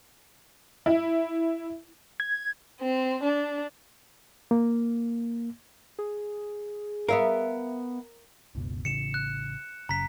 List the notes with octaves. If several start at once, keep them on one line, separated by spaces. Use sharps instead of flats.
E4
G#6
C4
D4
A#3
G#4
B3 A#4 E5 F5
F#1 C#2 B2
A1 C#3 C#7 E7
F#6
F#1 C#3 A#5 B6